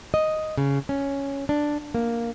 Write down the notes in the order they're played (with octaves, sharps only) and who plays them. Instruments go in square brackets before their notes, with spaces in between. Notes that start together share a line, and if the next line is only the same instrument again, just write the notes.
[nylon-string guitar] D#5
C#3
C#4
D4
A#3